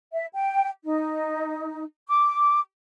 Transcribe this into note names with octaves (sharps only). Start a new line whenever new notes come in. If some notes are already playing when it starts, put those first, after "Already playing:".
E5
G5
D#4
D6